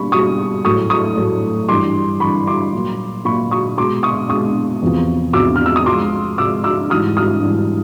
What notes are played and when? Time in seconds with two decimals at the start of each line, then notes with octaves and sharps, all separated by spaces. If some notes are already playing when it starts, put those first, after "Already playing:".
Already playing: B2 G3 A#3 B5 C#6
0.12 B2 G3 A#3 C#6 D#6
0.65 A2 F#3 A3 C#6 D#6
0.90 C#6 D#6
1.17 A2 F#3 A3
1.69 G2 E3 G3 C6 D6
2.20 G2 E3 G3 B5 C#6
2.47 C6 D6
2.73 A#2 F#3 A#3
3.25 A#2 F#3 A#3 B5 C#6
3.51 C#6 D#6
3.77 B2 G#3 C6 D6
4.03 C#6 D#6
4.29 B2 G#3 C#6 D#6
4.82 E2 C3 F3
5.33 E2 C3 F3 D6 E6
5.56 F6
5.66 E6
5.76 D#6
5.86 C3 F3 G#3 C6 D6
6.38 C3 F3 G#3 D6 E6
6.64 D6 E6
6.90 G#2 E3 G3 D#6 F6
7.17 D#6 F6
7.42 G#2 E3 G3